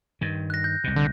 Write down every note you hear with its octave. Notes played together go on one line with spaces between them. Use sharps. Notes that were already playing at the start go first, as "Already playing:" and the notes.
G2 D#3
F#6 A#6
G6
C2 B2
D3